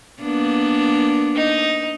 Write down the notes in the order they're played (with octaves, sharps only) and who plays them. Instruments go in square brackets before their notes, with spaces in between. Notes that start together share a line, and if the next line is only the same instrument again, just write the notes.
[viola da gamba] A#3 B3 D4
[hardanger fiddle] D#4